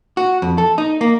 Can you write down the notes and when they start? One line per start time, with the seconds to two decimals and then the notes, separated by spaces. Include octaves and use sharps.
0.17 F#4
0.42 F2
0.58 A4
0.78 D#4
1.01 A#3